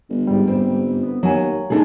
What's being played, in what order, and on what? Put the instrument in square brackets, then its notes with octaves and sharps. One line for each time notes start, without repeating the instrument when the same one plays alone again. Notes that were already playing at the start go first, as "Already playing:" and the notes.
[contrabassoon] G1
[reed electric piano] G#2 G3
[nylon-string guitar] C4
[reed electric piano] B3
[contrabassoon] D#2 [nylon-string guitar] F#3 G#5
[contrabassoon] D#1 [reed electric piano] A#2 A4 [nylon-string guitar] D4 D#4 G#4